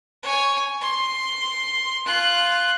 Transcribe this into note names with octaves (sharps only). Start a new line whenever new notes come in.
C#5 G#5
C6
F4 F#6